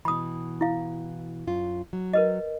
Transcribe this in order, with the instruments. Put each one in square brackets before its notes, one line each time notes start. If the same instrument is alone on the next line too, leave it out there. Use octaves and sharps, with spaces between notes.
[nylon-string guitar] B2 E3 [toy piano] B5 D#6
[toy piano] E4 F5
[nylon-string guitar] F#2 F4
F#3
[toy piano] A#4 B4 D#5